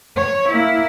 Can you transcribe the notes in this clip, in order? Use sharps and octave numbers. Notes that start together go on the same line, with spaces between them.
C#5
A#3 E4